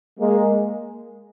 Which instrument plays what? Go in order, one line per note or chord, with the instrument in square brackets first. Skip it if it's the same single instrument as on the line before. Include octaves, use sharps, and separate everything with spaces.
[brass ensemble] G#3 A#3